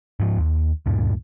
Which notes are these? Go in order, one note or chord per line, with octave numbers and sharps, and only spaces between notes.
G#2 F3
D#2
D2 G2 A#2